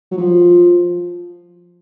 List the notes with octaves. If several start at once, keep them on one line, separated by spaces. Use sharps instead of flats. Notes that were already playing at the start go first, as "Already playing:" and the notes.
F#3
F3